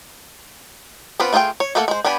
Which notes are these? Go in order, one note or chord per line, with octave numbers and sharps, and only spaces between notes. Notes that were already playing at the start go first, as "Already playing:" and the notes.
B3 C4 D4 F4 B4
A3 F4 G#4 C#5 G5
C#5
A3 A#3 A4 D5 F#5
G#3 C5
B3 D4 G4 G#5 B5